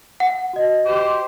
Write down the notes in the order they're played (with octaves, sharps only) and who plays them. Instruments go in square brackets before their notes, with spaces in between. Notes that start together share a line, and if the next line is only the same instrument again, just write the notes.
[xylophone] F#5
[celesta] F#4 D#5
[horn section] G4 C5